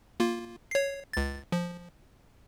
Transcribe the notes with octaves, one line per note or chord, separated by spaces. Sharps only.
A#3 F4
C#5 C7
C#2 A6
F3